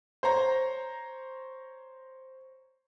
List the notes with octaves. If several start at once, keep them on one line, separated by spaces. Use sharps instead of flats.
C5 C#5 A#5